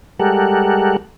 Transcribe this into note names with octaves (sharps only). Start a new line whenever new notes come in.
G3 G#3 G4 A4 A#4 F#5